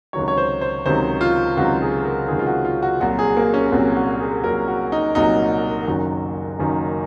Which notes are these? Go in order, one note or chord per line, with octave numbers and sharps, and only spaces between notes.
C#2 C3 D#3 F#3 C#5
C#5
C5
C5
C#2 C3 D#3 F#3 C5
F4
C#2 C3 D#3 F#3 F#4
G#4
A#4
C#2 C3 D#3 F#3 G#4
F4
F#4
F4
F#4
C2 A#2 F#3 F#4
G#4
A#3
C#4
C2 A#2 F#3 C4
F#4
G#4
C2 A#2 F#3 A#4
F#4
D#4
C2 A#2 F#3 D#4
F#1 F#2 D#3 F#3
F#1 F#2 D#3 F#3